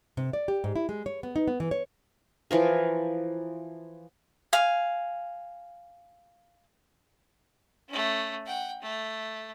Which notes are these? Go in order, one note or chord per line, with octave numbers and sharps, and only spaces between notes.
C3
D5
G4
G#2
E4
G#3
C#5
B3
D#4
B3
E3
C#5
E3 F3 A#4
F5 G#5
A3 C#4
F#5 G5
A3